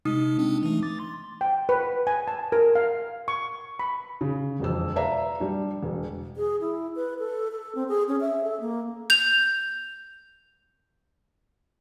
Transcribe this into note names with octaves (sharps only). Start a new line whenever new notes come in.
C3 G#3 D#4 D#6
G#3 C4 D4
E3 A3
D6 A6
C6
G5
B4
G#5
A5
A#4
F5
C#6
B5
C#3
E1 F2 E6
B4 D5 E5 F5 A#5
G3 D4
E1
G#4
E4
B4
A4
A4
C4
G#4
C#4
E5
A4
A#3
G6 F7